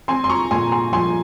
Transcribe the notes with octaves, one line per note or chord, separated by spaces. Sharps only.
C4 G#5 C6
C6
A#5 C#6
A#2 G#5 C6
G#5 C6
F3 G#5 C6